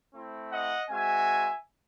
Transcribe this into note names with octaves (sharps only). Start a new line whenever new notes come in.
A3 C4 E4
D#5 F#5
G#3 C4 F#4 E5 G#5